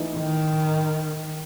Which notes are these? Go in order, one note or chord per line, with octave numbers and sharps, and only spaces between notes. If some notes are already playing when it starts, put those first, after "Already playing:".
Already playing: E3 A3 D#4
D#3